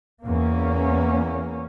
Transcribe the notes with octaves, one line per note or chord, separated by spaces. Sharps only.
E2 A#3 C#4